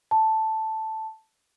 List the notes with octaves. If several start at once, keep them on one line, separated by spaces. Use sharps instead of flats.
A5